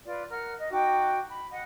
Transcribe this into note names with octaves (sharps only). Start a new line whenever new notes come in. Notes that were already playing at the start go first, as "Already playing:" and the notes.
F4 B4 D5
A#4 F#5 F6
D#5
D#4 F#4 G5 D6
B5
D#5 F#5